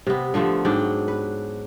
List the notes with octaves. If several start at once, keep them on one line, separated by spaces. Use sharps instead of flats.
C3 B3
D3 F3 A3 B3
G#2 F#3 D4 G5
B4